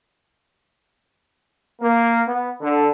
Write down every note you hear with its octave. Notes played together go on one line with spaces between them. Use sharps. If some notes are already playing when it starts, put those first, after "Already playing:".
A#3
B3
D3